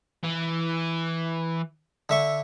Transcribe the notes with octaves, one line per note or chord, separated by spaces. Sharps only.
E3
D3 E5 C#6